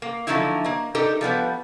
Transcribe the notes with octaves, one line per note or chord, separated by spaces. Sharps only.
A#3
D3 F3 F#3 A3 D#4 E4
A#3 D#5
D4 D#4 G4 A4 A#4 D#5
F3 G3 B3 B4